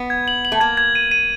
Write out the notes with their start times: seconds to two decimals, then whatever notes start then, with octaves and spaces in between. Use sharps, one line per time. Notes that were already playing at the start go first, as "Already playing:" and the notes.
Already playing: B3
0.10 G#6
0.28 F#7
0.45 F#7
0.52 A3
0.60 A#3 G#6
0.77 G#6
0.95 D#7
1.11 D#7